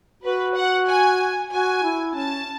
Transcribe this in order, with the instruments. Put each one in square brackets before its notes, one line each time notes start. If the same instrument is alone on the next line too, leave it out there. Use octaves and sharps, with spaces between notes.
[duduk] F#4 [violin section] B4
[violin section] F#5
G#5
[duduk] F#4 [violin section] G#5
[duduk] E4
[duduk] C#4 [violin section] A5